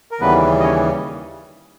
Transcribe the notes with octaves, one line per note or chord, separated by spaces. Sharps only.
A#4
D#2 C#3 E3 G3 B3 B4
D#5
C#4 C#5